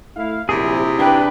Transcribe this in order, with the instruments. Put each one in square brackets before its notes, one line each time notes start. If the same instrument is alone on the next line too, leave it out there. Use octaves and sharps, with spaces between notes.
[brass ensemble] A3 E4 F5
[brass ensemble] A#1 F#2 [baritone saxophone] C3 [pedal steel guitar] E4 G#4
[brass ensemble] D4 [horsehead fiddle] B4 G5